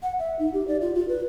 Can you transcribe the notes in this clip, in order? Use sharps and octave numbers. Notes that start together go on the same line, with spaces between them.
F#5
E5
D#4
G4
D5
F4
F4
B4